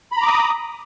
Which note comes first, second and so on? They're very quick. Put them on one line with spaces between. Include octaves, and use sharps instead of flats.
B5 A#5 D6 D#6